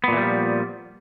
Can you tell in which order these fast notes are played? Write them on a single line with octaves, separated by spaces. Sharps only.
B3 A#2 E3 G3 F3